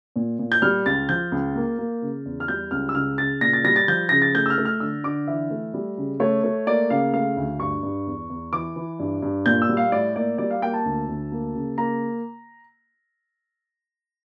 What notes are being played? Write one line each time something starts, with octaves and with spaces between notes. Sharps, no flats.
A#2
A#2
G6
G3 F6
C#2 A6
F3 G6
C#2
A#3
A#3
C#3
E2
F6
G3 G6
C#2 F6
E6
C#3 F6
C#3 A6
A#2 A#6
A6
G3 A#6
A6
F3 G6
C#3 A#6
A6
A3 G6
E6
F6
A3
F6
D3 E6
D3 D6
E3 E5
A3
G3
C#3
A3 C#5
A3
A#3 D5
C#3 F5
A3 F5
D2
G2 C#6
G2
E2
E2
E3 D6
E3
G2
G2
A#2 G6
E6
G3
F5
A2 D5
A#3 D5
G3 D5
F5
A#3 G5
A5
D2
D2
A#3
C#3
A#3 A#5